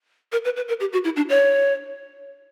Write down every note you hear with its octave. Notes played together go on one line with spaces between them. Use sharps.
A#4
B4
B4
A#4
G4
F#4
E4
D4
C#5